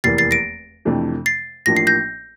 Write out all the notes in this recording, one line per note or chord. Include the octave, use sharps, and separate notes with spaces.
F1 E2 E3 A#3 A6 C7
A6 C7
A#6 D7
F2 C3 E3 A3 D4
A6 C7
A1 A2 F3 A#3 D4 A#6
C7
G6 A#6